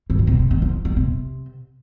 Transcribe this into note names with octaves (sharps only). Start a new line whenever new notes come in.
G2
A#2
C3
C3
D#3
F3
G3
C3